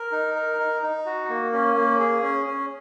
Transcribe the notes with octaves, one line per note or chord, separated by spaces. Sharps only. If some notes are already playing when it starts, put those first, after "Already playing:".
Already playing: A#4
D#4
A#4
D#4
D#4
F#4
A#3
C#4
A#3
G#4
C#4
C#4